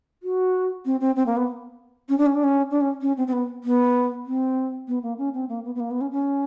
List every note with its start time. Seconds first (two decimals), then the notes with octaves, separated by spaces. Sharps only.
0.23 F#4
0.85 C4
1.01 C4
1.16 C4
1.26 A#3
1.37 B3
2.09 C#4
2.18 D4
2.26 C#4
2.35 D4
2.44 C#4
2.71 D4
2.81 C#4
3.01 C#4
3.17 C4
3.27 C4
3.33 B3
3.64 B3
4.26 C4
4.88 B3
5.03 A#3
5.18 C#4
5.34 C4
5.49 A#3
5.65 B3
5.75 B3
5.80 A#3
5.91 B3
6.01 C#4
6.11 C#4